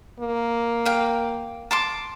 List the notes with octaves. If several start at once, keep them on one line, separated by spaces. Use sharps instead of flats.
A#3
F5 G5
A5 C6 D6